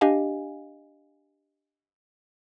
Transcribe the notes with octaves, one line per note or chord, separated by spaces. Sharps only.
D4 G4 D#5 F5 G#5